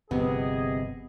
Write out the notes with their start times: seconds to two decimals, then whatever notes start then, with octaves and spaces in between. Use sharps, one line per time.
0.11 G1 C3 F3 B3 G#4 B4 D#5